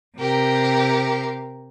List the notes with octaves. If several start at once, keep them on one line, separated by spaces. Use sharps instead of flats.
C3 G4 A#4